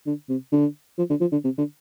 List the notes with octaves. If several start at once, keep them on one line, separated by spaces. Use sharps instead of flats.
D3
C3
D3
F3
D3
F3
D3
C3
D3